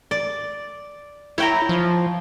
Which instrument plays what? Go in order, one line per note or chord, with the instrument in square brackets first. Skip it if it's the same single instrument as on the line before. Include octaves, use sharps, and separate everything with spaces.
[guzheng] D5
[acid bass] E4 [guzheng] C#5 G5 A#5
[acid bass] F3